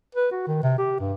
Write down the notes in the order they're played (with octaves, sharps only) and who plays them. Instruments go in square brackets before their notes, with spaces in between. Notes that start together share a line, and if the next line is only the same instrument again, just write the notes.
[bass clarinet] B4
F#4
D#3
C3
G4
G2